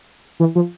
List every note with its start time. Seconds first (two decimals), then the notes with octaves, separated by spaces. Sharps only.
0.40 E3
0.55 F3